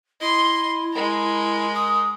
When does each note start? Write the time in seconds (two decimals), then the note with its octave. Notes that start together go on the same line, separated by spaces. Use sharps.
0.21 E4 D#5 C6
0.92 G#3 A#4
1.74 D#6